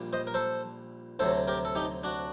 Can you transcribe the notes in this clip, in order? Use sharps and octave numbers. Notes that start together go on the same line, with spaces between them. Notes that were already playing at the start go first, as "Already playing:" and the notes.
Already playing: A#1 A#2 G3
C5 D#5
A#4
A4 C5
D2 C3 F#3 A4 C5
G4 A#4
A4
D#4 G4
D4 F#4